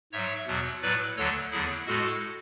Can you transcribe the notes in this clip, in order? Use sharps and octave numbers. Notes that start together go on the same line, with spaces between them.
G#2 F#3 C#5 E5
E2 B2 F#3
A2 F#3 B4 D5
D2 D3 F#3 A4 C#5
E2 D3 F#3 E4 G#4
A2 G#3 F#4 A4